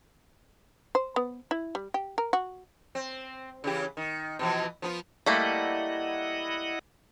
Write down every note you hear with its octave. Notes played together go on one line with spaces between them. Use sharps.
C5
B3
E4
G3
G4
A#4
F#4
C4
C#3 E3 G4
D#3
B2 E3 F3
F3 B3 F4
G3 A3 A#3 E4 D#5 F#5